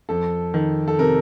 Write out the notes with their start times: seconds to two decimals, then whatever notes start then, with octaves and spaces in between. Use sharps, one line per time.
0.09 F2 A4
0.54 D#3
0.88 A4
0.99 C3 A#4